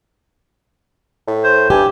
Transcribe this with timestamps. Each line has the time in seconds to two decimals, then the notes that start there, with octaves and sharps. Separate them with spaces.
1.28 A2
1.43 C5
1.70 G2 G4 G#5